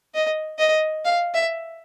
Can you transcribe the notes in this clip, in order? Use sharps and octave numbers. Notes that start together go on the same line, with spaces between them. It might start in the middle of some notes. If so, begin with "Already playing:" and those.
D#5
D#5
F5
E5